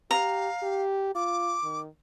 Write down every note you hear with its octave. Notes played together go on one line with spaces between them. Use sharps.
G4 F5 A#5
G4
F4 D6
D#3